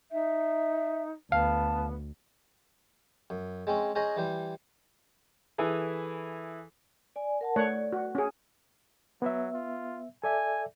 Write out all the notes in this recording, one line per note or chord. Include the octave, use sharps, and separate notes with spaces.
D#4 E5
D2 B3 F5 A5
F#2
G#3 C4 C#4
C#4 G#4 C5 D#5 A#5
E3 G3 C5
E3 E4 G#4 A4
D5 G#5
A#4 F#5 A5
A3 C#5 D5 F#5
F#4
C#4 G#4
F#3 B3 E5
F4
A4 D5 E5 G#5